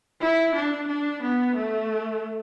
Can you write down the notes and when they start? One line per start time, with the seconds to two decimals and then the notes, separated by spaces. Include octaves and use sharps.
0.21 E4
0.55 D4
0.88 D4
1.22 B3
1.56 A3